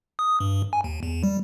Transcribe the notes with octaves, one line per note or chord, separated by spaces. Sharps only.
D#6
G2
G#5
D#2
E2
G3